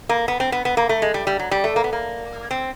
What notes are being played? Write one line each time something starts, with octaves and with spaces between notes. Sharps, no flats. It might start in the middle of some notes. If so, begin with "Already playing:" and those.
A#3
B3
C4
B3
B3
A#3
A3
G#3
G3
G3
F#3
G3
A3
A#3
B3
A#3
C4